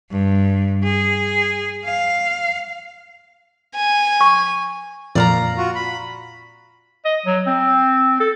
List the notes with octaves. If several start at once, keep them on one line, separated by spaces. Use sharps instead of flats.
G2
G#4
F5
G#5
C#6
F2 A#2 D5 F5 A#5
F4 F#4
B5
D#5
F#3
C4
A4